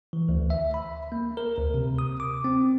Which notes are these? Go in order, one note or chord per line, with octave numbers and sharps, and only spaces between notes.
E3
D2
E5
B5
A#3
A#4
D2
C3
D#6
D6
C4